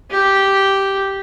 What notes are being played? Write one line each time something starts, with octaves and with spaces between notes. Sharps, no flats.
G4